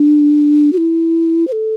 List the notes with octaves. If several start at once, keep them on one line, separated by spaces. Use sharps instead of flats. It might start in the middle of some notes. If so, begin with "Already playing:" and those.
Already playing: D4
F#4
E4
C5
A4